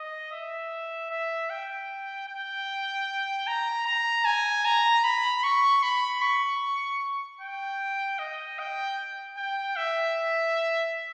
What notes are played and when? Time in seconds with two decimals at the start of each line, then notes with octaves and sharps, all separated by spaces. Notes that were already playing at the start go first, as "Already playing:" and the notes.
Already playing: D#5
0.32 E5
1.11 E5
1.50 G5
2.28 G5
3.47 A#5
3.86 A#5
4.25 G#5
4.65 A#5
5.04 B5
5.43 C#6
5.83 B5
6.22 C#6
7.41 G5
8.19 D#5
8.59 G5
9.37 G5
9.76 E5